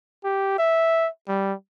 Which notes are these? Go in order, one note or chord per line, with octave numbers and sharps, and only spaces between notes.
G4
E5
G3